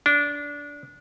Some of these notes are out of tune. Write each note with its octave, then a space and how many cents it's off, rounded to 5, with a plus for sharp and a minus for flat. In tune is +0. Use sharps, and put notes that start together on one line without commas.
D4 -20